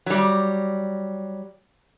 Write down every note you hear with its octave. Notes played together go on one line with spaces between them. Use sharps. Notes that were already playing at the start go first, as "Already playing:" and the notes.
F#3 G3